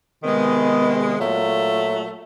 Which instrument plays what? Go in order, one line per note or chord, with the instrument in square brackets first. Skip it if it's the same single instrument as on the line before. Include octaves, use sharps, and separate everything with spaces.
[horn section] C3 D#3 G#3 B3
A#2 F#3 A3